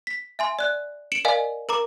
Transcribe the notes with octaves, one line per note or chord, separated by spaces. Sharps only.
B6
E5 G#5 C6
D5 F#6
C#7 D7 E7 F#7
A#4 D5 D#5 F5 G#5
A#4 A#5 D6